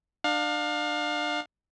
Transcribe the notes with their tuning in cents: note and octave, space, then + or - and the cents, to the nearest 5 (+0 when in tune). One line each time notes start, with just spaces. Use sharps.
D4 +30 F5 +25